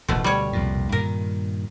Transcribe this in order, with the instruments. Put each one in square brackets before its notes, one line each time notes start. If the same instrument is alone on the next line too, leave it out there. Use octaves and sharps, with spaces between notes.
[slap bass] D1 A1 [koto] B2 A3
[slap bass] D2 [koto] G3 C#5
[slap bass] C2 F2 A#2
[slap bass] G2 A#2 D#3 [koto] A#4